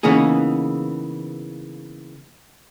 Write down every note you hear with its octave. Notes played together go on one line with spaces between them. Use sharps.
C#3 E3 A#3 B3 D#4 G#4